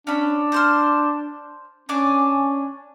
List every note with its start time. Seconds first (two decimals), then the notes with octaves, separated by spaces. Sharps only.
0.07 C#4 D4 B5
0.52 C5 C6 F6
1.89 C#4 D4 G#5 D6